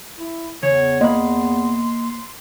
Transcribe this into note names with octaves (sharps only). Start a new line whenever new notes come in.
E4
E2 C#3 C#5
A#3 D#5 B5 C6